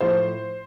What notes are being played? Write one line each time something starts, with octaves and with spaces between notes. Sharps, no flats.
A2 F3 C5